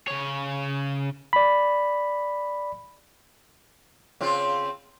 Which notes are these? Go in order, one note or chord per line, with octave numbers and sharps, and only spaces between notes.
C#3 C#5
D5 B5
C#3 C4 F4